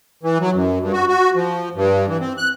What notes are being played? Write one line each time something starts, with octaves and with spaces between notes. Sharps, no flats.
E3
F#3
F#2
G2
F#4
F#4
F3
G2
E3
C4
F#6